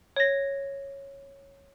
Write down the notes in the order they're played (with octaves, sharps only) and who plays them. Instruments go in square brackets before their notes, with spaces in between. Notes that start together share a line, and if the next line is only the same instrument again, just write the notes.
[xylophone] C#5 A#6